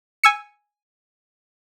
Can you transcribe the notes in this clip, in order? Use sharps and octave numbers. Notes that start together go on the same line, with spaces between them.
G#5 E6 C#7